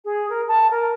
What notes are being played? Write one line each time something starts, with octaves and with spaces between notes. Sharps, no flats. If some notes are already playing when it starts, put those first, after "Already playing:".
G#4
A#4
A5
A#4